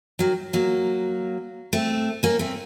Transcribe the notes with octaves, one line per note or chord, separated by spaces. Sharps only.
D#3 F#3
F#3 A#3
A3 C4
A#3 C#4
A3 C4